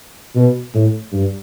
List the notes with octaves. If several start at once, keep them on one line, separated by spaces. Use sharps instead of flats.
B2
A2
G2